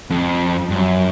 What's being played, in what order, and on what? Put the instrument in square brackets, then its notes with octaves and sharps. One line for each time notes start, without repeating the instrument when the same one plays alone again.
[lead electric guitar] F2
G2
F#2